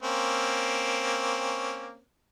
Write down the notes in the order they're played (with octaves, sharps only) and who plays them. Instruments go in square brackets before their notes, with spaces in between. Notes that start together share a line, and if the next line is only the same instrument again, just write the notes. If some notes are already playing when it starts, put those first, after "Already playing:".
[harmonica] A#3 C4 C#4